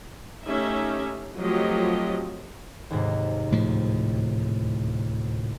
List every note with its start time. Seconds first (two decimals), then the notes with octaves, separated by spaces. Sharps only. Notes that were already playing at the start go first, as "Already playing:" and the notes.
0.46 A3 C#4 D#4 G4 E5
1.38 F3 F#3 A3 C4 G4 D#5
2.90 D#2 G#2 C3
3.51 D2 A2 F3